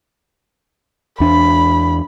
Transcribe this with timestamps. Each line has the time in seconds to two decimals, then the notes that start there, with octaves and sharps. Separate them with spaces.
1.20 E2 D4 B5